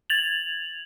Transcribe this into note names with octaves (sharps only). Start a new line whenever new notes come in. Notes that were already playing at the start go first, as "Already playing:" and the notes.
G#6 A6 F7 F#7